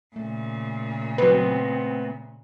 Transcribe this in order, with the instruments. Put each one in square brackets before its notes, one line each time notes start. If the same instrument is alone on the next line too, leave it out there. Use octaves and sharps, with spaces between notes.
[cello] A#2 C#3 [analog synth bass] A3
[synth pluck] F#3 B4 [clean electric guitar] B3 C4